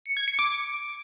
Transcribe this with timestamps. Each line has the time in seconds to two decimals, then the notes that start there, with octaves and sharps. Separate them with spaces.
0.06 C#7
0.17 G#6
0.28 C#7
0.39 D6